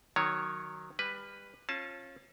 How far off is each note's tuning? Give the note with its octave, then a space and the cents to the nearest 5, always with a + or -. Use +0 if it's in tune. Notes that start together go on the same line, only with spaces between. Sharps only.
D#3 -10 F#3 +0 C#5 +0
G3 +25 B4 +0 G#5 +0
C#4 -30 F4 +0 A5 +0